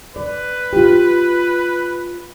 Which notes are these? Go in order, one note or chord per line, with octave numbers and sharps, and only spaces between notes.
B4 D5
F4 G4